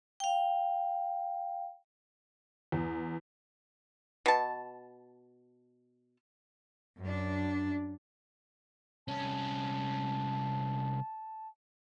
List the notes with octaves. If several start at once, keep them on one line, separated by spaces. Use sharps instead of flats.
F5 G5
E2
B2 A5
F#2 D4
C2 C#4 A5